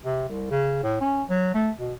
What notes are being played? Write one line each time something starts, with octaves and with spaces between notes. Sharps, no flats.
C3
C2
C#3
A2
C#4
F#3
A3
B2